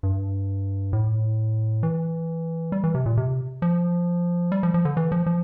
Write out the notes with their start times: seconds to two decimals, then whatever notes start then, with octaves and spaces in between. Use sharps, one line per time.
0.03 G2
0.93 A2
1.83 E3
2.72 G3
2.84 E3
2.95 C3
3.06 A#2
3.17 C3
3.62 F3
4.52 G3
4.63 F3
4.74 F3
4.85 D3
4.97 E3
5.12 F3
5.26 F3